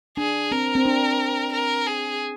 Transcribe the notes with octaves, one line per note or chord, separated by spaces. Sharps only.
D4 G#4
C4 A#4
C4
D4
A#4
G#4